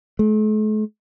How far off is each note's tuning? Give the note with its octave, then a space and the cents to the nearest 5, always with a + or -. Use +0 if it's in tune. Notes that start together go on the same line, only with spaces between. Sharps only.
A3 -45